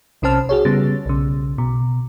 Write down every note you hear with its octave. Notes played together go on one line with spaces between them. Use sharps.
B1 C3 C#4 C5 A5 F6
F#4 G#4 C#5
C#3 G3 B3 A6
B1 C#3
B2